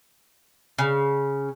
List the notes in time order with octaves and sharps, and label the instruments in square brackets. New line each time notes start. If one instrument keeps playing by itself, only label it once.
[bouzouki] C#3